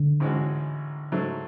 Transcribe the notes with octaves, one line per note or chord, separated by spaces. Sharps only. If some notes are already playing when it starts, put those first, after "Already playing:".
Already playing: D3
A1 G#2 G#3 C#4 F#4
G#2 C#3 F#3 A3